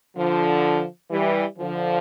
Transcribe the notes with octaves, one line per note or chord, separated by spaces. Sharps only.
D3 F3
E3 G3
D3 F3